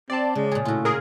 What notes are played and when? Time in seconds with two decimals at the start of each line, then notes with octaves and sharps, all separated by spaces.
0.10 C4 D5 A5
0.35 C#3 G#3
0.51 A#2 G#4
0.65 A2 F4 F#4
0.85 F4 G#4 A#4